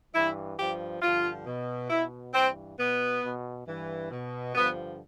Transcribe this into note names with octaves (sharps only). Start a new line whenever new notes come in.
G2 E3 E4
G2 F3 G4
G2 D3 F3 F4
B2
B2 E4
G2 E3 C4
B2 B3
B2
G2 E3
B2
G2 D3 F3 B3